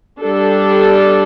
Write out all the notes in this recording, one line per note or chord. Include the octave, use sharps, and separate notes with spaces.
G3 D4 A4